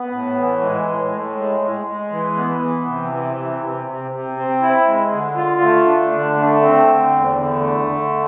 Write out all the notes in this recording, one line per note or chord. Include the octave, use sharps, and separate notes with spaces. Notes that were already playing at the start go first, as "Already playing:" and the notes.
Already playing: B3
A2
E3
G#3
A2
A2
G#3
G#3
G#3
E3
B3
E3
C3
E3
C3
C3
C3
C3
C4
E4
G#3
D3
F4
A3
D4
D3
A3
C4
D3
E2
D3
A3
D3